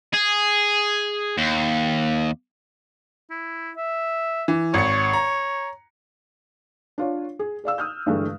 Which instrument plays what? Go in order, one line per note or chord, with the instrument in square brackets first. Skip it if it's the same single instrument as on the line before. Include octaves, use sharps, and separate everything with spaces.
[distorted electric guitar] G#4
D#2
[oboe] E4
E5
[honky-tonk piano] E3
[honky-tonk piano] G#1 C#7 [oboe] C#5
[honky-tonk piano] A#5
[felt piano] D4 F4 C#5
G#4
G#4 D5 F5 E6
D#6 F6 G6
G2 D3 E3 G#3 A3